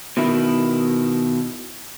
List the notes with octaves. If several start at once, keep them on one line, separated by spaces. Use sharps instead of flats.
B2 D#3 E4